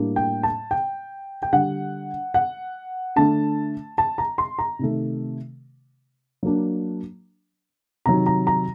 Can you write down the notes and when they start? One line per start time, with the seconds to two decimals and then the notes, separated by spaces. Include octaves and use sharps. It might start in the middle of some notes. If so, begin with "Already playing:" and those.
Already playing: A2 G3 A#3 D4
0.16 G5
0.43 A5
0.71 G5
1.43 G5
1.52 D3 G3 D4 F#5
2.34 F#5
3.16 D3 A3 D4 A5
3.98 A5
4.18 A#5
4.38 C6
4.59 A#5
4.79 C3 D#3 A3
6.43 F#3 A#3 D4
8.06 C3 D#3 F#3 A#5
8.26 A#5
8.47 A#5